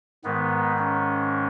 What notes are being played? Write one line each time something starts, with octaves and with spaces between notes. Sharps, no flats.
G#2 D#3 G#3 B3
C#4